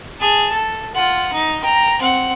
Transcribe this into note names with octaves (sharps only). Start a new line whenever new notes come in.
G#4 A5
A4
F4 F#5
D#4
G5 A#5
C4 F#5